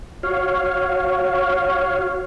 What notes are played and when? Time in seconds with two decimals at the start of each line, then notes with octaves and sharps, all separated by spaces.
0.23 F#4 C#5 F5